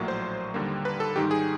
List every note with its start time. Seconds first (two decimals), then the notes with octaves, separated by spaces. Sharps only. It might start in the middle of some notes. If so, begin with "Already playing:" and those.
Already playing: A#1 A2 F#3 A#3
0.08 C5
0.54 D#2 D3 G3 A#3
0.85 B4
1.00 A4
1.15 G#2 D#3 G3 G4
1.31 G#4